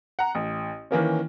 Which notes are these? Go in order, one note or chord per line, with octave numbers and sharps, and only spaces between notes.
F#5 A#5
A1
D#3 E3 A#3 C#4